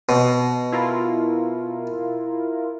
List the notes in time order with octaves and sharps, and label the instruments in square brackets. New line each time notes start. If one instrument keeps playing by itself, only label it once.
[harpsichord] B2
[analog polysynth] E4 F4 A#4